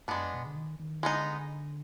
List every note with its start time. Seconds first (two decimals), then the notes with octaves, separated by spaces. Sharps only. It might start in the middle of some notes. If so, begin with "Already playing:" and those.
0.08 F#2 G#3 B3 D4
0.24 F2
0.34 B2
0.46 D3
0.56 D#3
0.79 D#3
1.03 D3 G#3 B3 D#4